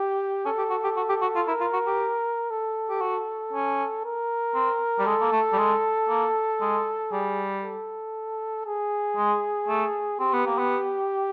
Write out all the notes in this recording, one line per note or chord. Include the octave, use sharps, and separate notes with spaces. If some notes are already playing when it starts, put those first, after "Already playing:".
Already playing: G4
C#4 A4
G4
F#4
G4
F#4
G4
F#4
F4
E4 A#4
F4
F#4
G4
A4
G4
F#4
C#4
A#4
C4
G3
G#3 A4
A#3
A3
G3
G#3
A#3
G#3
G3 G#4
A4
G#4
G#3
A3
C4 G4
B3
A#3
B3